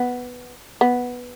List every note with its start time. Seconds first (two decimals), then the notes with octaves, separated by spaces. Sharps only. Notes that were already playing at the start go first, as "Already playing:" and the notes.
Already playing: B3
0.81 B3